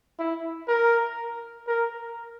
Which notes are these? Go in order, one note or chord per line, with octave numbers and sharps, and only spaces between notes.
E4
A#4
A#4